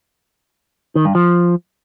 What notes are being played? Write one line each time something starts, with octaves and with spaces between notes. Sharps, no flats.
D#3
G2
F3